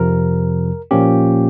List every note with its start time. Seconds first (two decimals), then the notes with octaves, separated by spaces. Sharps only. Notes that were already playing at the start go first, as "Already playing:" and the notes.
Already playing: F2 C3 F3 A#4
0.91 A#2 F3 A#3 C#4 G4